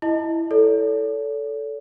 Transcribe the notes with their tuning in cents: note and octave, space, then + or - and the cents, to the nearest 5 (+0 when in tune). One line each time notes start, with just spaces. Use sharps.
E4 +0 D#5 +0 A5 +0
A4 +0 C#5 +45